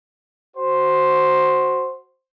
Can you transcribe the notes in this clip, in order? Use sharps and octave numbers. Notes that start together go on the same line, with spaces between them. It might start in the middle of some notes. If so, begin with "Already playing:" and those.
F#4 C5